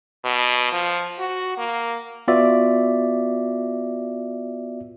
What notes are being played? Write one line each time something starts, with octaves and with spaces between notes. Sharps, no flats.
B2
F3
F#4
A#3
B3 F4 F#4 D5 E5